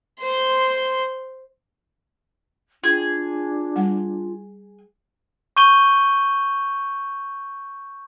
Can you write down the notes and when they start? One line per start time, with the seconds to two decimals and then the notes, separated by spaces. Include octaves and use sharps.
0.20 C5 C6
2.83 D4 F4 G#4
3.76 G3 F#5
5.57 C#6 G6 D#7 G7